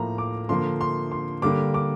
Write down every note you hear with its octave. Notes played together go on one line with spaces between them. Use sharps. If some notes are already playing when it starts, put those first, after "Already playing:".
Already playing: A2 F3 A#3 A#5
D6
D3 F3 A#3 C6
C6
C6
D3 G3 A#3 D6
D6